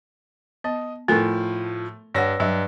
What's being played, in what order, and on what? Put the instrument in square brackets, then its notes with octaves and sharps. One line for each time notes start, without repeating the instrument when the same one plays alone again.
[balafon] B3 [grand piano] D#5
[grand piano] A2 F3 [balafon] A3 A4 A#4
[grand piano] G2 E6 A#6 [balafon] C#5 F#5
[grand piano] G2 [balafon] F#3 E5